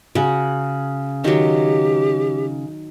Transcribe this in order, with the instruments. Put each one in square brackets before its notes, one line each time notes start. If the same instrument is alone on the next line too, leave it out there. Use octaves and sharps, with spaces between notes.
[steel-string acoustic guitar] C#3 [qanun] F#4
[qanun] D#3 F#3 [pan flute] G4